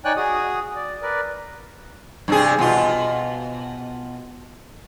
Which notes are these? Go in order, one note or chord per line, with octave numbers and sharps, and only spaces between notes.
D#4 C#5 D5 G5 G#5 F#6
F#4 G#4 D#6
D5
A#4 B4 D5
G2 C3 G#4
B2 F4